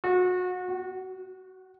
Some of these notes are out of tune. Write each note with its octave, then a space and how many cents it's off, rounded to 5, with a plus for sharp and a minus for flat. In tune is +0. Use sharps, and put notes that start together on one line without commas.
F#4 -30
F#4 +20